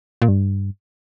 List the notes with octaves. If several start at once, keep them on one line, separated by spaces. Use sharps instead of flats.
A#2
G2